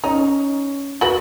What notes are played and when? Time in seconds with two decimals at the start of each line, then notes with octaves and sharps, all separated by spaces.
0.04 C#4 D#4
1.01 F#4 B4 F#7